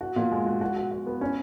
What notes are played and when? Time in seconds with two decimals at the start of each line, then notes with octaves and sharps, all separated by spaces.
0.01 F#4
0.16 A#2
0.31 G#3
0.46 F#4
0.61 F#4
0.76 F#4
0.91 F#4
1.06 B3
1.21 C#4